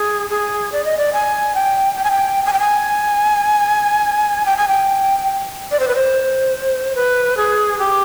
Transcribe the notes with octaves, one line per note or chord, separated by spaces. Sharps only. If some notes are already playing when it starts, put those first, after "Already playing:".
Already playing: G#4
G#4
D5
D#5
D5
G#5
G5
G5
G#5
G5
G#5
G5
G#5
G5
G#5
G5
D5
C5
B4
C5
B4
G#4
G4